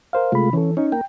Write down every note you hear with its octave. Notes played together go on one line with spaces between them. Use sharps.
A#4 C5 F5
C3 G#3 A3 F4 B5
E3 C#4 A4
C#4 D#4 C#5
A#3 A#4 G5